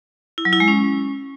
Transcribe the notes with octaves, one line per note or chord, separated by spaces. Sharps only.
E4
F#3
E4
G#3
C#4